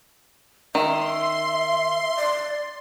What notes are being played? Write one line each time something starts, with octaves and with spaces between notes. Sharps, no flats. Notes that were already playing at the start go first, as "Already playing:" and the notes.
D#3 E5 C6
D5